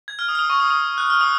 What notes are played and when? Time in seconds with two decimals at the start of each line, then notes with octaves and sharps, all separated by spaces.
0.08 G#6
0.19 F6
0.28 D#6
0.35 F6
0.39 D#6
0.50 C#6
0.60 D#6
0.70 D#6
0.98 F#6
1.10 F6
1.21 D#6